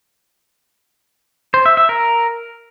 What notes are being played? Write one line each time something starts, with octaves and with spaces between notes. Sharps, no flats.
C5
E5
E5
A#4